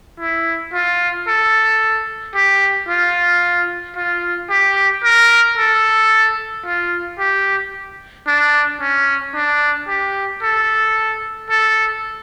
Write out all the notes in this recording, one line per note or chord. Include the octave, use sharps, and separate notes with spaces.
E4
F4
A4
G4
F4
F4
G4
A#4
A4
F4
G4
D4
C#4
D4
G4
A4
A4